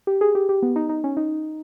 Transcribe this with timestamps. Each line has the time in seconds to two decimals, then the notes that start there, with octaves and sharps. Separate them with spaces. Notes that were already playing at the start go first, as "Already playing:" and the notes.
0.07 G4
0.21 G#4
0.35 G4
0.49 G4
0.62 B3
0.76 D#4
0.89 D#4
1.04 C#4
1.17 D#4